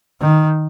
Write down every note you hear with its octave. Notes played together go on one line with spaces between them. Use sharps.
D#3